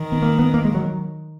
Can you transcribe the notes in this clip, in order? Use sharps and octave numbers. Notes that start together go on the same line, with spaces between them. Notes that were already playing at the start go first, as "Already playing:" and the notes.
Already playing: D#3
B3
A#3
B3
A#3
G#3
F#3